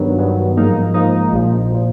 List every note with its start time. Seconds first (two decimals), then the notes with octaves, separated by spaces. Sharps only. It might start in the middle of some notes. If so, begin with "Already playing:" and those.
Already playing: G2 D#3 F#3 B3
0.18 G2 D#3 F#3 B3
0.57 G#2 F3 A#3 D#4
0.94 G#2 F3 A#3 D#4
1.31 A#1 A#2 F3
1.72 A#2 F3